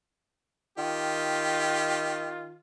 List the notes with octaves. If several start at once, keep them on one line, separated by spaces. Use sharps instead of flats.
D#3 F4 G4